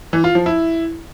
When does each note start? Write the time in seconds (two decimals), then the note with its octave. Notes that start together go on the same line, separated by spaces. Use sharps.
0.13 E3
0.24 F4
0.35 F3
0.46 E4